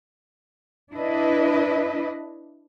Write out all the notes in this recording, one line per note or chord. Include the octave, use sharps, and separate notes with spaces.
D4 E4 B4 D#5